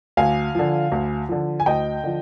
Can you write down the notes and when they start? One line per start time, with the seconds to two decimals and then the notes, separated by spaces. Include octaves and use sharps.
0.17 D2 F5 G#5
0.55 D3 F3
0.92 D2
1.29 D3 F3
1.60 G#5
1.66 D2 D#5 G5
2.04 D3 F3